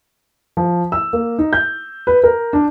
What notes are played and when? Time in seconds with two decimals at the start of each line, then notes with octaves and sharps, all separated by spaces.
0.57 F3
0.92 E6
1.13 A#3
1.39 D#4
1.53 G6
2.07 B4
2.24 A#4
2.53 D4